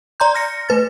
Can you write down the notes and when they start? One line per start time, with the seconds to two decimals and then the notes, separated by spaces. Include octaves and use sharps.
0.20 D5 A#5 C6 G6
0.34 F6 A#6 C#7
0.69 A3 B4 A6